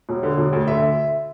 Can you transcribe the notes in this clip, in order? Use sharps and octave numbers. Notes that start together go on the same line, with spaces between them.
E1
D3
E1
D2
D3 E5